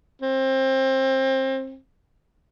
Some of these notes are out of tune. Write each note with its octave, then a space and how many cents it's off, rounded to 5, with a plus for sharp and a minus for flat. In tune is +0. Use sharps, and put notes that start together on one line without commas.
C4 +25